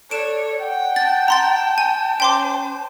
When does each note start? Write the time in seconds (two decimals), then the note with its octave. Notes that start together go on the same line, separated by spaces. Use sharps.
0.11 A4 C#5 D5 D7 E7
0.61 F#5 G5
0.96 A5 A6
1.28 A#5 C6 A6
1.78 G#5
2.20 C#4 C5 G5 C6 D6